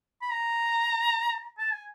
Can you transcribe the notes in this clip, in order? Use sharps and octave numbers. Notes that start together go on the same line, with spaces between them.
B5
A#5
A5
G#5